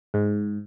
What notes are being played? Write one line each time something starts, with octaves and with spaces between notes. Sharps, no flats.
G#2